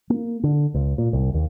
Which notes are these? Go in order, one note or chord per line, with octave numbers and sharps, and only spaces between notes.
A#3
D3
C#2
A#2
C2
D#2